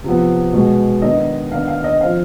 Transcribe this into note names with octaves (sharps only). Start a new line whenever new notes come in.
C3 F3 B3
B2 G#3 B3
D#3 B3 D4 D#5
D#3 B3 D4 F5
F5
D#5
F3 C4 F5